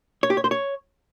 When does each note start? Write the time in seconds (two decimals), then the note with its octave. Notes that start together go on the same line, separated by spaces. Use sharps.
0.23 C#5
0.30 G4
0.37 C#5
0.44 C5
0.51 C#5